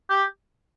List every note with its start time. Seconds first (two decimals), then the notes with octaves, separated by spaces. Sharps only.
0.10 G4